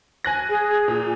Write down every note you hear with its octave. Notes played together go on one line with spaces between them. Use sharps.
G#5 F#6 A#6
G#4
A#2